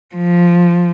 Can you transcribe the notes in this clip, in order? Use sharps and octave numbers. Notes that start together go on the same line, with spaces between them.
F3